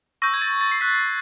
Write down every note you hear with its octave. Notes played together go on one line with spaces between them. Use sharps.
C#6 E6 G6 A#6
G#6
A6
A6
C7
C#6 F#6 B6